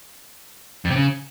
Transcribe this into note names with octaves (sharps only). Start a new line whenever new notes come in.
F2
C3
C#3